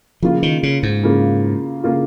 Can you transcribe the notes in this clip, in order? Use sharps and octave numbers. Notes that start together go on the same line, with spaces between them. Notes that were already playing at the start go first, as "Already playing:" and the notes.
C#3 F3 A#3 F4
D#3
C#3
G#2
C#3 A#3 F4
C#3 A#3 F4